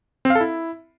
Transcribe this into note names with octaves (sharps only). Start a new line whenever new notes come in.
C4
F5
A4
E4